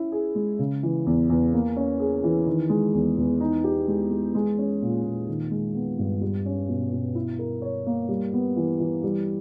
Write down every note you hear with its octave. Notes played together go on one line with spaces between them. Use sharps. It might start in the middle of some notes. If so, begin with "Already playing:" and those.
Already playing: C#4 E4
G#4
G#3
C#3
E3
E2
E2
A#3
C#4
G#4
E3
D#3
G#3
E2
E2
D#4
G4
G#3
G#3
G#3
C#4
A#2
A#2
D#3
G#3
B3
G2
G3
C#4
B2
B2
E4
A#4
C#5
A#3
G3
B3
E3
E3
G3